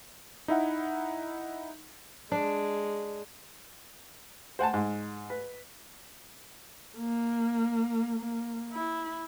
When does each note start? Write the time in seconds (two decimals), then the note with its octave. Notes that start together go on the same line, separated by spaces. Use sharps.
0.48 D#4 E4 E5 F#5
2.32 G#3 D4
4.59 C5 F#5 G#5 A5
4.74 G#2
5.30 B4
6.98 A#3
8.19 A#3
8.72 E4